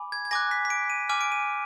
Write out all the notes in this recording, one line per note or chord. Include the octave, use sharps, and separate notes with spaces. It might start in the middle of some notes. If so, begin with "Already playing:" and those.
Already playing: G#5 B5 D6
G#6
G#6
G#5 D6 F#6 A#6
B6
B6
D7
D#7
G#5 D6 F6 D#7
D7
D#7